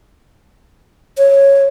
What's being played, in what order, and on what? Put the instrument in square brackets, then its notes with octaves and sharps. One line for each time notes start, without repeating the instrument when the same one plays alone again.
[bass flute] C#5